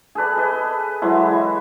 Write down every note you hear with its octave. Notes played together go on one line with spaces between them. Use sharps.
G#4 A4 B4 D5
B4 D#5 B5
E3 F#3 G#3 E4